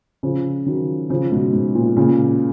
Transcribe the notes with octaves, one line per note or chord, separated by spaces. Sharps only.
C#3 F3
D#3 F#3
C#3 F3
G#2 B2
G#2
A#2
A#2 C#3